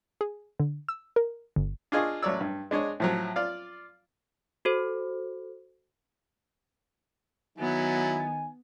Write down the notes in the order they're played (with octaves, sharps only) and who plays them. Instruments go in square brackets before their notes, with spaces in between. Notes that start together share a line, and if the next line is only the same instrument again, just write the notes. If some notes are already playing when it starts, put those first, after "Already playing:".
[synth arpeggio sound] G#4
D3
E6
A#4
G1
[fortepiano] D4 F4 G#4 D#5 C#6
A1 F#3 C#5 D5 E6
G2
G#3 D4 C#5 D#5
A2 F3 F#3
F4 D5 F5
[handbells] F#4 A4 C5
[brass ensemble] D#3 D#4 G#5 [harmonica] F#3 E4 [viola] B3